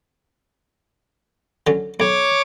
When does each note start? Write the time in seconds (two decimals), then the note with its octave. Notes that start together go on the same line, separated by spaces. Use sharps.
1.67 D3 F#3 C#4
2.00 B1 C#5 D6